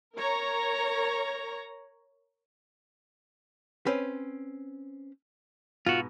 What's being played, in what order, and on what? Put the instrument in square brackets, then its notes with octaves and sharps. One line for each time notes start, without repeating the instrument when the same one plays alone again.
[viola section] A#4 C#5 A#5
[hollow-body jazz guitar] C4 C#4 B4
[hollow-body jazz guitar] G#2 B2 [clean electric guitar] F4 F#4